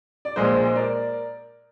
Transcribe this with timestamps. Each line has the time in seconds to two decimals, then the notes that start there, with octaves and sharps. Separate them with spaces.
0.25 D5
0.36 A#1 A#2 G#3 C5 D#5
0.76 A#4 D5